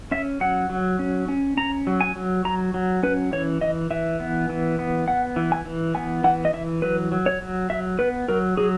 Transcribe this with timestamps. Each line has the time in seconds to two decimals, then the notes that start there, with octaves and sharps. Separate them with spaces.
0.11 C#4 E5
0.40 F#3 F#5
0.70 F#3
0.99 C#4
1.28 C#4
1.57 C#4 A#5
1.87 F#3
2.01 G#5
2.16 F#3
2.45 F#3 A#5
2.74 F#3
3.03 C#4 B4
3.32 E3 C#5
3.61 E3 D#5
3.90 E3 E5
4.20 B3
4.49 E3
4.79 B3
5.08 B3 F#5
5.36 E3
5.52 G#5
5.66 E3
5.95 B3 G#5
6.24 E3 F#5
6.45 D#5
6.53 E3 E5
6.82 F#3 B4
7.12 F#3
7.26 C#5
7.41 F#3
7.70 F#3 E5
7.99 B3 B4
8.28 F#3 A#4
8.57 F#3 G#4